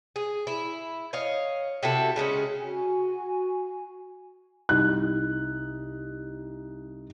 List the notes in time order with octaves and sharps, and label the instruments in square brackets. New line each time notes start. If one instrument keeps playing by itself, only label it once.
[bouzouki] G#4
E4
C#5 D#5 F5
C3 E4 F#4 A4
C#3 G#3 A3 C#4
[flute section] F#4 G#5
[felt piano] C2 D#4 F#6